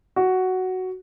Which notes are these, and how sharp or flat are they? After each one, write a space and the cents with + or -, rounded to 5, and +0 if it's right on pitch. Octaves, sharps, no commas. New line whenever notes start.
F#4 +5